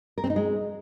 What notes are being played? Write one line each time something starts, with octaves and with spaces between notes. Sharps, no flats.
A#4
C4
D#4
G#3